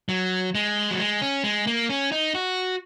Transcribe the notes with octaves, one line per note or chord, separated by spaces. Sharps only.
F#3
G#3
F#3
G#3
C#4
G#3
A#3
C#4
D#4
F#4